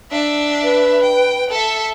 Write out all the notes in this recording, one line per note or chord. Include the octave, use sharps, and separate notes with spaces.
D4 E5
B4
G5
A4 E5